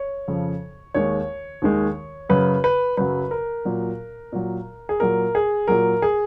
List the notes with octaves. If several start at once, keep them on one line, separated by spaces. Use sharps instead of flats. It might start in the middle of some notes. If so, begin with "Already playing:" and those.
Already playing: C#5
F2 C#3 F3
D#2 D#3 G#3 C#5
D#2 D#3 G#3
F#2 C#3 F#3 B4
B4
F#2 C#3 F#3 B4
A#4
A#2 F#3
A#2 F#3
G#4
A#2 F#3 A#4
G#4
A#2 F#3 A#4
G#4